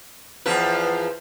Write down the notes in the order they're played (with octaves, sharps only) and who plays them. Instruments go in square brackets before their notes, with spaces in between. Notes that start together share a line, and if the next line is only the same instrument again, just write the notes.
[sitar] E2 F3 B4